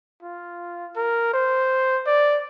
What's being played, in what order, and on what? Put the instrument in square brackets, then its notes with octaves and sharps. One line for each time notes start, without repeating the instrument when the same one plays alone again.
[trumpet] F4
A#4
C5
D5